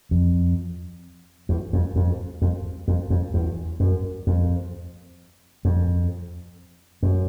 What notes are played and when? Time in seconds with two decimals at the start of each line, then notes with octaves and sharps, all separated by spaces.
0.11 F2
1.49 E2
1.73 F2
1.96 F2
2.42 F2
2.88 F2
3.10 F2
3.34 E2
3.80 F#2
4.27 F2
5.65 F2
7.03 F#2